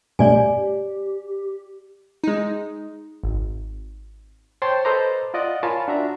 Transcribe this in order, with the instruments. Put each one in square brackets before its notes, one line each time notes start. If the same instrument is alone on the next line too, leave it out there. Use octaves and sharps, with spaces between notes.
[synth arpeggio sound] G2 B2 A3 [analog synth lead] G4 [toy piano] C#5 D5 G#5
[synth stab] G#3 D#4
G#1
[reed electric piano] C5 C#5 G5 A5 C6
A4 B4 C5 D#5 A#5 D6
F4 D5 D#5 F#5 D6
F4 A#4 C#5 G#5 A5 B5
D4 F#4 E5 A#5